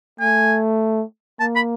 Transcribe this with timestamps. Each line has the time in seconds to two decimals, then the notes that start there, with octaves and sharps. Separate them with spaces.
0.20 A3 G#5
1.40 A#3 A5
1.56 B5